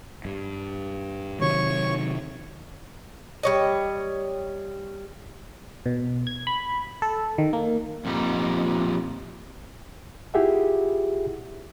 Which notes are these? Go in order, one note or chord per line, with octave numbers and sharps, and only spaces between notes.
G2
C3 D#3 F#3 C#5 C#6
G3 C#5 D#5
B2
G#6
B5
A4
D#3
A#3
F2 A#2 G3 D#4
E4 F4 G4 G#4 E5 F#5